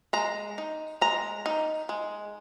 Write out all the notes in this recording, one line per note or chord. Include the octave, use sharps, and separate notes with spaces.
G#3 A#5
D#4
G#3 A#5
D#4
G#3